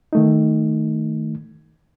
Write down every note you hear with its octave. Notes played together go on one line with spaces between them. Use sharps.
D#3 A3 D#4